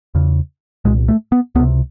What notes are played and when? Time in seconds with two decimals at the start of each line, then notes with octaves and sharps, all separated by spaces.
0.15 E2 C#3
0.85 C2 A#2 G#3
1.08 A3
1.32 B3
1.55 C#2 B3
1.60 C3